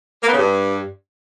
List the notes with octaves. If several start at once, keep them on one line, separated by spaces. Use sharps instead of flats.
A#3
B3
C#3
G2